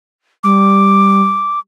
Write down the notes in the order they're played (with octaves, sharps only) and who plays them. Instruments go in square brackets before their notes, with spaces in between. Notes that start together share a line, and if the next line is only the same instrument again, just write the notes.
[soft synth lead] G3 [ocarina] D6